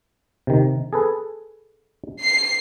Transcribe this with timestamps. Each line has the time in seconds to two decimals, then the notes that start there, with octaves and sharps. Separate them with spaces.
0.47 C3 D#3
0.93 G#4 A4 B4
2.21 C7